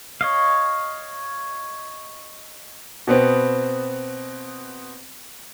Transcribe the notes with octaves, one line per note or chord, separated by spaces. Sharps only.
C#5 D#5 F5
B2 B3 C4